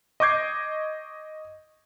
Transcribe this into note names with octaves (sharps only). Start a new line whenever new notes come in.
D#5 C#6 D6 G6 G#6 C7